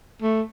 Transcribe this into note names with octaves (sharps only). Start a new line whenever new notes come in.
A3